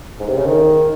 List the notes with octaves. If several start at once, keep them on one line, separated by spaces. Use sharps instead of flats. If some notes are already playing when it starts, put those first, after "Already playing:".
G#2
C3
C#3
D#3